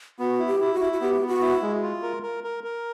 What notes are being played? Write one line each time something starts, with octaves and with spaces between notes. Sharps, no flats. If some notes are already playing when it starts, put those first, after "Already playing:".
B3 F#4
E4
G4
E4
F#4
E4
F#4
B3 G4
B3
F#4
E4
G#3
F4
A#4
A#4
A#4
A#4